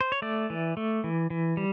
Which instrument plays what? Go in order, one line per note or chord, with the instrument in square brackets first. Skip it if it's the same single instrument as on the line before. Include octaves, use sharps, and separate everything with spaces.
[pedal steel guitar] C5
C#5
A3 D5
E3
A3
E3
E3
G3